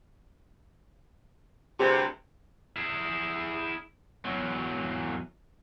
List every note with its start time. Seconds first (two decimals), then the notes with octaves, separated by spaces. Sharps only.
1.80 D2 G2 C3 G4 G#4 C5
2.76 E4 G#4
4.25 E2 F#3